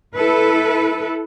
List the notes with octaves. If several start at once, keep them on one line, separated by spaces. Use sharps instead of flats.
E4 A4 B4